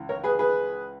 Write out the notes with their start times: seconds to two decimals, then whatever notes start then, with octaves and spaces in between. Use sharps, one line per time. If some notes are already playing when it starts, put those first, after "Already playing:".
Already playing: C#2 E3
0.09 A#4 C#5
0.24 G#4 B4
0.39 G#4 B4